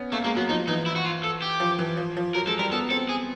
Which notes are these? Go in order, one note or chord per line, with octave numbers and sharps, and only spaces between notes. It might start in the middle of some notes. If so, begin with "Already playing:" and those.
Already playing: B3 C#4
A3 A#3
G#3 A#3
F#3 B3
F3 D#4
E3 D#4
E4
F#4
F4
A4
G4
F3
E3
F3
F3
F#3 A#4
G#3 A4
G3 A#4
B3 A4
C4 A4
G#4